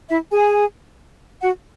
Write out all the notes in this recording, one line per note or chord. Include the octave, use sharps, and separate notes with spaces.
E4 E5
G#4 G#5
F#4 F#5